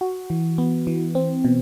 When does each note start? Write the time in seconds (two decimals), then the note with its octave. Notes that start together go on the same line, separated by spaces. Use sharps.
0.01 F#4
0.30 E3
0.58 B3
0.87 E3
1.15 C4
1.44 B2